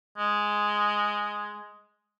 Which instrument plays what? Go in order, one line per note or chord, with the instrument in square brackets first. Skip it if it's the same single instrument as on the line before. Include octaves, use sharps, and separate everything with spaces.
[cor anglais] G#3